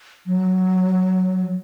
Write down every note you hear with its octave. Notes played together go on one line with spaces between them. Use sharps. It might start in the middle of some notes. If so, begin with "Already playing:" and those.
F#3